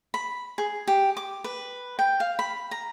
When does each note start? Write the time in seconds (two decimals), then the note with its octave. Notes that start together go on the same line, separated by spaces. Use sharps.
0.14 B5
0.58 G#4
0.88 G4
1.17 D6
1.44 B4
1.99 G5
2.20 F5
2.39 B5
2.71 A#5